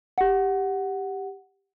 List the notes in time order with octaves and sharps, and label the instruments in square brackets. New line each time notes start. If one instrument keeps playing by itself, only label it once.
[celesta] G4 F#5